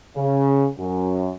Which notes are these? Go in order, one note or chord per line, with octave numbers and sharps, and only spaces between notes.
C#3
F#2